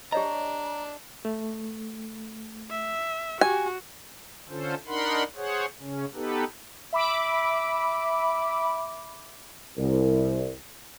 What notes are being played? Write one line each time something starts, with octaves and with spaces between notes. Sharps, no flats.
D4 G4 C#5 D#5 A#5
A3
E5
F#4 G4 G#5
D3 C#4 F4 A4 C5
D4 D#4 A#4 F#5 B5 C6
G#4 C5 C#5 F#5
C#3 C#4
B3 D#4 G4 A4 B4
E5 B5 D6
C2